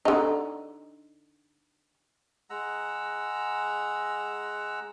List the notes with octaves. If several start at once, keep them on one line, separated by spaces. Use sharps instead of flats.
D3 D#4
G#3 F#5 A#5 E6